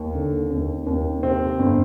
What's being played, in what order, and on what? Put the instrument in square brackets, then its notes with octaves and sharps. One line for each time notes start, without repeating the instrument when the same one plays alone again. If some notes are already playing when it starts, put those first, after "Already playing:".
Already playing: [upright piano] D#2
D3
D#2
D#2
C3 C4
G1